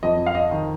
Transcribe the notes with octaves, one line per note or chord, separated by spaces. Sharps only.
F2 D#5
F5
D#5
D#3